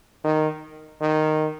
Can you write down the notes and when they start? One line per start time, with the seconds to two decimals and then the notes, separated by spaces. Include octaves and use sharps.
0.25 D#3
1.02 D#3